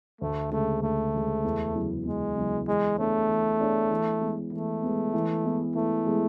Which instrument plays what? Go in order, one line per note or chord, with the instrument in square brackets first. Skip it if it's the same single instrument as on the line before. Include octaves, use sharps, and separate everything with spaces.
[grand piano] D2 [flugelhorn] A3
[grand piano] C#3 G#3 [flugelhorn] A3
[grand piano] D2 [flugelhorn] A3
[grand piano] C#3 G#3
E2
C#3 F#3 B3 E4
[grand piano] E2 [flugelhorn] G#3
[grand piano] C#3 F#3 B3 E4
[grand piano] E3 [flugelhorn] G#3
[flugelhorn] A3 [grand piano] B3 D4 G#4 C#5
[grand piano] E3
B3 D4 G#4 C#5
E3
G#3 B3
[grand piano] E3 [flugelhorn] A3
[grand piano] G#3 B3
E3
G#3 B3 E4
[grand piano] E3 [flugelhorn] A3
[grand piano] G#3 B3 E4